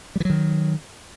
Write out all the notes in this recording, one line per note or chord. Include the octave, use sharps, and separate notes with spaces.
D#3 E3 F#3 G3